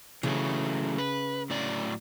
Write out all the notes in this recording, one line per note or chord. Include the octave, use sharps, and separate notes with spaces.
C#3 E3 F#3 A3
B4
A2 F#3 D5